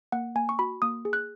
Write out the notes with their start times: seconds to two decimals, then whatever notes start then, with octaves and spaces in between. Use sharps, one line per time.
0.12 A#3 F#5
0.35 A#3 G#5
0.49 C#6
0.59 F#4 B5
0.82 A#3 D#6
1.05 G#4
1.13 F#6